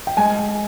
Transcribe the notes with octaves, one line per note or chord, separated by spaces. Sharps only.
G5
G#3 G#5